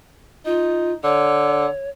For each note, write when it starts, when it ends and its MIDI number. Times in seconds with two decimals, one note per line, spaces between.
0.46 0.95 63
0.46 0.93 65
1.04 1.67 50
1.04 1.90 73